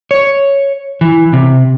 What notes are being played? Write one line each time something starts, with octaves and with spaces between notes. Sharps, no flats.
C#5
E3
C3